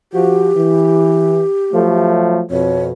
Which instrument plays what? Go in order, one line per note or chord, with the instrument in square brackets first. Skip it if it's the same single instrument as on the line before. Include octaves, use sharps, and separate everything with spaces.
[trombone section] F3 F#4 [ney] G4
[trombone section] E3
F3 F#3 A3
[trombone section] F2 B2 [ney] C#5